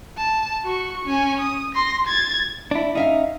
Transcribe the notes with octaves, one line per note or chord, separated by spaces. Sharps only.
A5
F#4 C#6
C#4 G#5
D#6
C6 A#6
G#6 A6
D4 E4
C#4 D#4 E5 F5